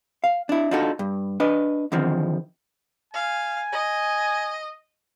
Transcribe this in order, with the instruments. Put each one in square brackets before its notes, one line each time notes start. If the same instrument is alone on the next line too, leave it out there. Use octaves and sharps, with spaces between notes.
[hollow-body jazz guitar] F5
D4 E4
D4 D#4 F4 F#4 A4
G2
D4 B4 D#5
E2 D3 D#3 F3 C4
[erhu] F5 [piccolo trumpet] G#5
[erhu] D#5